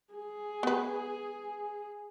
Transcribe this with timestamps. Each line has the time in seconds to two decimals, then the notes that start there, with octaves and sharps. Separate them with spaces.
0.14 G#4
0.63 B3 B4